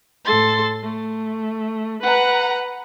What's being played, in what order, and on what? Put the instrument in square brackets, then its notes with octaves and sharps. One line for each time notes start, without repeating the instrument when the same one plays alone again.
[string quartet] A2 A4 C6 A6
A3
B4 F#5 A#5